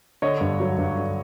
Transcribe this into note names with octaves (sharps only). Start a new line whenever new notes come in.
D3 C#5 D#5
G2
F#3
G2
D3